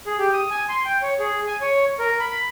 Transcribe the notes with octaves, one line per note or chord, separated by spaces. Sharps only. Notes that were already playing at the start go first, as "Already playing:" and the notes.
G#4
G4
D#6
G#5
C6
G5
C#5
G#4
G#5
C#5
A#4
B5